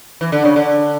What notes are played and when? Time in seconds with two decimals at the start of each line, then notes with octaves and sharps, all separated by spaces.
0.21 E3
0.32 D3
0.45 C#3
0.56 D3